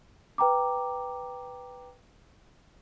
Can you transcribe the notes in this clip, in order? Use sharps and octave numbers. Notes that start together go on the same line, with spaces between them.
B4 G5 A#5 D6